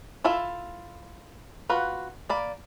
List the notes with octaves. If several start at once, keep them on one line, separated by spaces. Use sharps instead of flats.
E4 F4 A4 E5
F4 F#4 B4
A#3 D5 B5